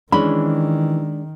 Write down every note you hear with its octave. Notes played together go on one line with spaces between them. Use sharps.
D#3 E3 G#3 C#4 D4 B5